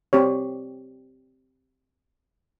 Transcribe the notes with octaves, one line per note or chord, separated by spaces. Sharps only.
C4 G4 C#5